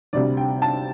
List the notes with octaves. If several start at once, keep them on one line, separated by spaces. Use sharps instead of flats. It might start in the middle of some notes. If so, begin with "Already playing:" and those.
D2 C3 G3 D5
G5
A5